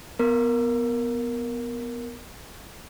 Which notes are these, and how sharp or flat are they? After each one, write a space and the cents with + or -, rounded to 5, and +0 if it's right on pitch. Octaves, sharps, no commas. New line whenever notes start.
B3 +0 A#4 +0